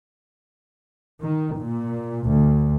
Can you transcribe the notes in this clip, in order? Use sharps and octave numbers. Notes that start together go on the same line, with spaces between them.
D#3
A#2
D2